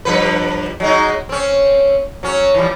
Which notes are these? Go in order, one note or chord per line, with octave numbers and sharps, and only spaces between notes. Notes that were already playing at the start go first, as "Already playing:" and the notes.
G2 F3 B4
F#3 G#3 D#4
C4 C#4
F#3 C#4
E3 F3 G3